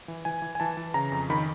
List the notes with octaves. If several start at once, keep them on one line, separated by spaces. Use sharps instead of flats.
E3
E3 G#5
E3
G#5
E3 A5
E3
C#3 A#5
F2
D#3 B5